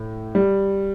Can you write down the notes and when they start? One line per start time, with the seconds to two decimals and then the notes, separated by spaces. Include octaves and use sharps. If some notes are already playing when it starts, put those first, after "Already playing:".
Already playing: A2
0.35 G3